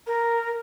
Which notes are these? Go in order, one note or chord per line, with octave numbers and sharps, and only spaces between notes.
A#4